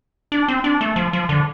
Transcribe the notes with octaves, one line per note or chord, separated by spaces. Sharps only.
D4
C4
D4
A3
F3
F3
D3